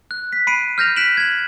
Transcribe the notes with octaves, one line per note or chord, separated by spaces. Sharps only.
F#6
B6
B5 C7 D7 D#7
F6 G6 A#6 F7
F#6 B6 D7 E7 F#7
G#6 F#7